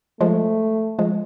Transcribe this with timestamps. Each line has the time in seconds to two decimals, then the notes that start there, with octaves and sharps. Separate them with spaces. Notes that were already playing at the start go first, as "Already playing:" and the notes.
0.21 F3 G#3 A3
0.99 F3 G#3